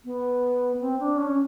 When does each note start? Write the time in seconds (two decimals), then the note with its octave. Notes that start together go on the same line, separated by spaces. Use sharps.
0.05 B3
0.81 C4
0.99 D4
1.17 C#4